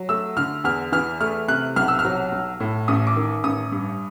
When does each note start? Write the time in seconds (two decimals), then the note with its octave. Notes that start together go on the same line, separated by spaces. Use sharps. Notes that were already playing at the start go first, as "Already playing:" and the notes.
Already playing: F#3
0.09 A3 E6
0.37 D3 F6
0.64 E2 F6
0.92 E3 F6
1.20 A3 F6
1.48 C3 F#6
1.76 B1 F6
1.88 E6
1.99 F6
2.05 F#3
2.32 B1
2.60 A2
2.88 A1 D#6
3.07 D6
3.16 D#3
3.44 A1 D#6
3.72 G2